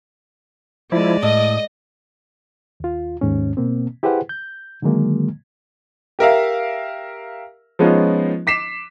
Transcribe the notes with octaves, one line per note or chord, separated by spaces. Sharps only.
F3 G#3 E4 D5
A2 D#5 D#6
D#2 F4
D#2 G#2 C#4
B2 A#3 C4
E4 G4 G#4 B4 C5 F#5
G6
D3 D#3 F#3 G#3 A#3
G4 A#4 E5 F5
F3 G#3 B3 C#4 D#4 F4
D6 B6 C7 E7